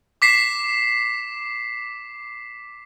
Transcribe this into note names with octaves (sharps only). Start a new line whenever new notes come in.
D6 B6 C7 E7